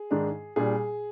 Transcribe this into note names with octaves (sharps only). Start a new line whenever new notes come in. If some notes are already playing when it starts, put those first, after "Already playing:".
Already playing: G#4
G#2 D#3 G#3 D4
A#2 G3 D4 G#4